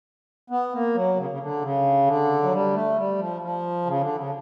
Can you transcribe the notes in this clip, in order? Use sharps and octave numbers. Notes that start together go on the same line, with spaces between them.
B3
A#3
F#3
C#3
C#3
D3
C#3
D3
F#3
G3
A3
G3
F3
F3
C#3
D3
C#3